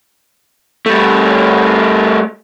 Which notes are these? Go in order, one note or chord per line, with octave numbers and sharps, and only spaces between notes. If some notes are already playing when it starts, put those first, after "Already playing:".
G3 A3